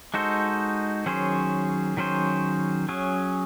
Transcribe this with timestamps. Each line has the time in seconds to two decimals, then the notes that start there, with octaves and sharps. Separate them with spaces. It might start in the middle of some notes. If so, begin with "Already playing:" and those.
0.14 G#3 D#4 F#4 A4 C5
1.06 D#3 F#3 C#4 G#4 C5
1.97 D#3 F#3 C#4 G#4 C5
2.89 F#3 C#4 G#4